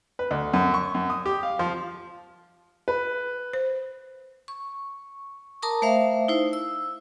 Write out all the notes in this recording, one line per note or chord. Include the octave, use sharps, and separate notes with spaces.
B4
D2
F#2
C#6
F#2
D#6
G4
F5
F3
B4
C5
C#6
A#4 A5 A#5 D6 D#6
A3 C5 E5 F5
D#4 E4 C5
E6